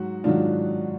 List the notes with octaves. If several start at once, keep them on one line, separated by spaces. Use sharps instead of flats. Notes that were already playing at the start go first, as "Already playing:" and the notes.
Already playing: G#2 F#3 F#4
G#2 D#3 F#3 D4 F4